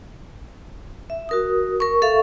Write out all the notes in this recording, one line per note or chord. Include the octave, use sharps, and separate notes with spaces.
E5
F#4 A#4 D#6
A#4 C#6
A4 E5 F5 C#6